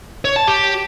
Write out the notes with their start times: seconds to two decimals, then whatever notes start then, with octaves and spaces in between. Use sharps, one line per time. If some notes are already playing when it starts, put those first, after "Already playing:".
0.25 C#5
0.36 A5
0.47 G4